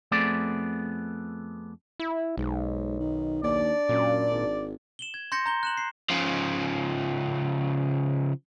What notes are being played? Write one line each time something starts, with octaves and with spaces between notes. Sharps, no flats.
F2 A3 B3 C4 G#4 D5
E4
B1 G#2
D#3
D#2 D4 D5
F#2 A#2
G#1
E7 F#7 G7
G#6
C6 G6 A#6 C#7
A#5 G6 G7
F#6 E7 F#7
C7
C#3 F3